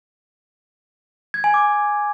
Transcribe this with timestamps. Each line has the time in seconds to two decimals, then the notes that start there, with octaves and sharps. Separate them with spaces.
1.34 G#6
1.44 G#5
1.54 D6